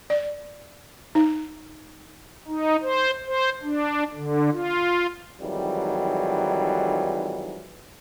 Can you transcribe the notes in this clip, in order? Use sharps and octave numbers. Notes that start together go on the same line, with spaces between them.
D5
D#4
D#4
C5
C5
D4
D3
F4
F2 G#2 D#3 E3 F#3 G3